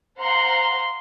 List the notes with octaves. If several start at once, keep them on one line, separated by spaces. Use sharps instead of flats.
C5 F5 F#5 A#5 C6